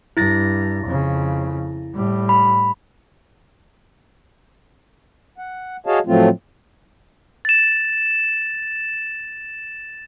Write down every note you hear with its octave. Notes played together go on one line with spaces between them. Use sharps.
G2 E4 A6 A#6
F2 C#3
A2 G3
B5
F#5
F#4 G#4 C#5 D#5 F5 A5
A2 F3 F#3 A3 C4 F4
A6 E7